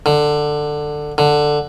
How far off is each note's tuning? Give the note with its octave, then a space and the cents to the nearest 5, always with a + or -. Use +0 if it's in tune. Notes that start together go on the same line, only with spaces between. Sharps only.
D3 +15
D3 +10